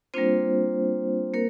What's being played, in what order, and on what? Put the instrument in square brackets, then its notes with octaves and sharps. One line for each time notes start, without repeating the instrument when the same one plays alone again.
[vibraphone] G3 A#3 C4 D4 F4 C5
A#3 A#4